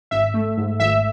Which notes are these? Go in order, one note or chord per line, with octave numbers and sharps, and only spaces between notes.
G#1 E5
A3
G#2
G#1 E5